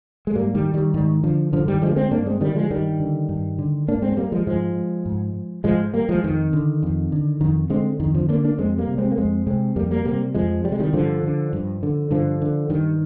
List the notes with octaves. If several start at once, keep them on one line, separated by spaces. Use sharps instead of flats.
G#3
G#2 G3 A#3
D#3 G3
D#3 G3
G#2 D#3
D3 F3
G2 D3 F3
D#3 G3
D3 F3 G#3
A#3
G#3 C4
G2 A#3 D4
G#3 C4
D3 D#3 G3
F3 G#3
G2 D#3 G3
D3
G2
D3
G#2 A#3 D4
G#3 C4
C4
G3 A#3
F3 G#3
G#2 F3 G#3
G#2
G#2 F3 G#3
G3 A#3
F3 G#3
F2 D#3
D3
F2
D3
F2 D#3
D3 G#3 C4
F2 D#3
D3 F3
D3 A#3 D4
A#3 D4
F2 G#3 C4
G3 A#3
C3
G#3 C4
A#3
F2 G#3 C4
C3 G#3 C4
F2 G3 A#3
G3 A#3
C3 G3 A#3
F2 F3 G#3
C3 G3
G#3
D#3 G3
G2 D3 F3
D3
G2
D3
G2 D3 F3
D3
G2 D#3